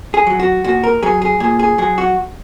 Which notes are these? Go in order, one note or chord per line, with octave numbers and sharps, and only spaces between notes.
G#4
F#3
F#4
A#2 F#4
A#4
F#3 G#4
G#4
A#2 G#4
G#4
F#3 G#4
F#4